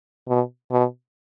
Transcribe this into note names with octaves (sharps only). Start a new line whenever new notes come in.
B2
B2